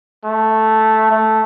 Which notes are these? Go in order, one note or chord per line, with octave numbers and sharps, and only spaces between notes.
A3
A3